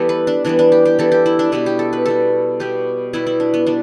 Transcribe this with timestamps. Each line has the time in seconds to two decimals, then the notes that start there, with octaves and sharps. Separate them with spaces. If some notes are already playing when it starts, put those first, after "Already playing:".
Already playing: E3 G3 B3 G4 A4
0.09 B4
0.27 D4
0.45 E3 G3 B3 D4
0.59 D4
0.72 G4
0.85 G4
0.99 E3 G3 B3 A4
1.12 G4
1.26 E4
1.39 D4
1.52 B2 G3 B3 E4
1.66 G4
1.79 A4
1.93 B4
2.06 B2 G3 B3 A4
2.60 B2 G3 B3 G4
3.13 B2 G3 B3 E4
3.27 E4
3.40 D4
3.54 B3
3.67 G3 B3 D4